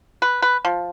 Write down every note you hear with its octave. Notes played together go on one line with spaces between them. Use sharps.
B4
B4
F3